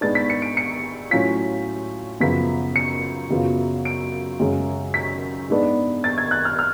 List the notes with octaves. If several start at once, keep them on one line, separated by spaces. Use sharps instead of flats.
G#2 G#3 B3 D4 A6
B6
C#7
D7
C#7
A2 F#3 C#4 F4 B6
F#2 C#3 F3 B3 F4 B6
C#7
F#2 C#3 F#3 B3 F4
D7
F#2 C#3 G#3 C#4
B6
G#2 G#3 B3 D4
A6
G#6
F#6
F6
F6